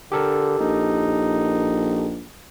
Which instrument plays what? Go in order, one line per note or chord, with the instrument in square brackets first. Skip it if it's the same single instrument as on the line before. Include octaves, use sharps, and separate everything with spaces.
[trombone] D3 [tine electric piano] G4 A4 A#4
[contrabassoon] A#1 [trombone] D#4